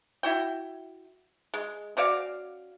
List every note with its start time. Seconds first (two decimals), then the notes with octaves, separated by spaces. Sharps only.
0.23 E4 F#4 G5
1.54 G#3
1.97 C#4 F#4 D5 F5